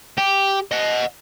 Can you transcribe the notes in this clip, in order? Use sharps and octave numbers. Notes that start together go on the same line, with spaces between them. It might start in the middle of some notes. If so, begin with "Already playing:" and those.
G4
D#5 F#5